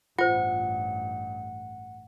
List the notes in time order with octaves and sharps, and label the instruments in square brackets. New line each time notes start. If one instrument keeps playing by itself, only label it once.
[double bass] A1 G2 [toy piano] F4 C5 [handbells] F#5